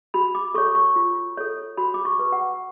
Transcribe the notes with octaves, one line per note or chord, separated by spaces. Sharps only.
F#4 B5
D6
A4 C#5 C#6
C#6
F4
A4 C#5
F#4 B5
D6
C#6
B4
F#5